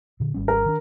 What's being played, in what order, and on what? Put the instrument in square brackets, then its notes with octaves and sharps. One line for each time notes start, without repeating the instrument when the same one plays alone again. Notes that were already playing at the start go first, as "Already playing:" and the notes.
[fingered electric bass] A#2 D3
G#1 G3 C#4
[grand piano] A#4
[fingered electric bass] D#3 D4